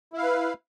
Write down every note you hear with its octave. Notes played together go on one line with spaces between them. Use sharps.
E4 B4 F5